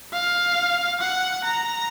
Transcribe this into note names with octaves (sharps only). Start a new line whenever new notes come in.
F5
F#5
A#5